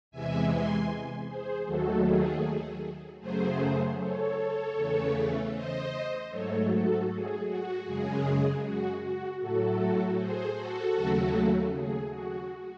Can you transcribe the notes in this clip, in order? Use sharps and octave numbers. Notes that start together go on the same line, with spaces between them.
E2 C3 E3 G#3 E5 G#5
G#5 C6
G#4 C5
D#2 D#3 F#3 A3 F#4 A4
G#4
F#2 C#3 F#3 A3 G#4 C5
A4 C#5
E2 C#3 E3 A3
C5 D#5
G#2 F#3 A3 A4 C#5
F#4 A4
G#4
F#4
F#2 C#3 G#3 G#4
F#4
F#4
A2 F#3 A3 F#4 A4
G#4 C5
F#4 A4
D#2 C#3 F#3 A3
G#4
F#4